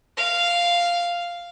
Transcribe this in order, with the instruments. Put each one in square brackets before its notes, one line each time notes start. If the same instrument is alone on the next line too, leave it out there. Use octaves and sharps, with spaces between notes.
[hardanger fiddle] F5